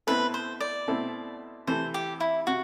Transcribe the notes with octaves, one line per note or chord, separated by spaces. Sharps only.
B2 A3 C4 E4 A4 B4
C5
D5
B2 A3 C4 E4 A4
C3 E3 A3 C5
G4
E4
C3 F#4